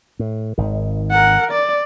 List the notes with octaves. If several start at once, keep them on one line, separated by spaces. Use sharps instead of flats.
A2
G#1 D#3
A#4 F#5
D5